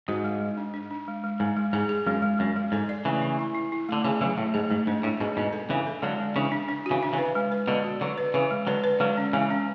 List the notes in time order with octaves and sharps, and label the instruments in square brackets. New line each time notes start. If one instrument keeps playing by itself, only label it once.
[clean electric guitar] G#2 [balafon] F#4
[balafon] G#3
G#3
D4
D4
D4
G#3
G#3
[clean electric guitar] G#2 [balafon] G#3
[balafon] G#3
[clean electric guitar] G#2 [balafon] G#4
[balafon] G#4
[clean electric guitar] F#2 [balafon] G#3
[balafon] G#3
[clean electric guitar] F#2 [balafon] G#3
[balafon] G#3
[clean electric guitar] G#2 [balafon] A4
[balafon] D5
[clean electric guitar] C#3 E3 [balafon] A3
[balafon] E4
E4
E4
E4
[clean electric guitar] D3 [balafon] A3
[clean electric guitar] C#3 E3 [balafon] G#4
[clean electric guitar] C#3 E3 [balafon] F#3
[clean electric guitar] A2 [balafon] A3
[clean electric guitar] G#2 [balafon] G#4
[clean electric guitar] G#2 [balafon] A3
[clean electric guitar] G#2 [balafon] D4
[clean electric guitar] A2 [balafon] D4
[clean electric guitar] G#2 B2 [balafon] G#4
[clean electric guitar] G#2 B2 [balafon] D4
[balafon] A4
[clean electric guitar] C#3 E3 [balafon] D4
[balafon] A4
[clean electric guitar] D3 F#3 [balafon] G#3
[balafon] G#3
[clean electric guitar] C#3 E3 [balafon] D4
[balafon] D4
D4
F#4
[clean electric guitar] C#3 E3
[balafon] D4
[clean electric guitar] C#3 E3
[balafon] B4
G#3
B4
[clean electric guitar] B2 D3 [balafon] G#3
[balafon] F#4
[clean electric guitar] D3 F#3 [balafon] B4
[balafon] B4
[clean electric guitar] C#3 E3 [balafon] B4
[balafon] G#3
[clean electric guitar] D3 F#3 [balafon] B4
[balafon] B4
[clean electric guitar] D3 F#3 [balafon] G#3
[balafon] C#4
[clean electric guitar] C#3 E3 [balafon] G#3
[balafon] C#4